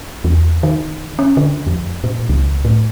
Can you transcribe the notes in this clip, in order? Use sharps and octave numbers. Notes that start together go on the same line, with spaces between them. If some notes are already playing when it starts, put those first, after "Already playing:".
E2
D#3
C#4
D3
F2
A#2
C#2
A2